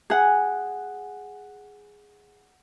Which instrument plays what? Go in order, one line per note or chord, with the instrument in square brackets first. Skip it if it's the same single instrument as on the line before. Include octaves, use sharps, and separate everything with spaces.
[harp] G#4 F#5